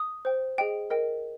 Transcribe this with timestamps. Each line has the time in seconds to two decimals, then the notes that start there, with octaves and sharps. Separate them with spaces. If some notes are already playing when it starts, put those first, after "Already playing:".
Already playing: D#6
0.25 C5 G5
0.58 G#4 D#5 G5
0.90 A#4 D#5 G5